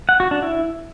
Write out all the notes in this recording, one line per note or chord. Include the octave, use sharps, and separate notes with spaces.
F#5
F#4
D4
E4